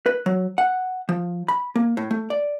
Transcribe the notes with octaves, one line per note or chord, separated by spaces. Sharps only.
B4
F#3
F#5
F3
B5
A#3
A2
A3
D5